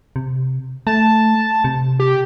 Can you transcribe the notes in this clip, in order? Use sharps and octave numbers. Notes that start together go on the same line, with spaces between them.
C3
A3 A5
C3
G4